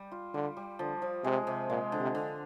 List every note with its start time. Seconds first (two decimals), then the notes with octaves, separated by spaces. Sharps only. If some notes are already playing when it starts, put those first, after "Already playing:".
Already playing: G3
0.12 F4
0.34 D3 G3
0.57 G3
0.79 D3 F3
1.02 F3
1.24 C3 G#3
1.47 C3
1.69 A#2 G#3
1.92 D3
2.00 C3
2.15 D3